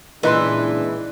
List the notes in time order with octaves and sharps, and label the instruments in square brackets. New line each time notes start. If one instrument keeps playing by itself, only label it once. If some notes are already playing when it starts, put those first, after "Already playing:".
[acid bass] A#2 [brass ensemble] C#3 G#3 D4 [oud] E3 [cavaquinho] D#4 B4 C6